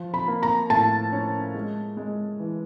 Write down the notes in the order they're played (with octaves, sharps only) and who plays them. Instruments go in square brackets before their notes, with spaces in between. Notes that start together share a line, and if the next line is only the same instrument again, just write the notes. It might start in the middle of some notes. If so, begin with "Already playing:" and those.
Already playing: [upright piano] F3
[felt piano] B5
[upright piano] A#3
[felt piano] A#5
[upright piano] A2 [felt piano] A5
[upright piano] C#4
G#3
G#3
E3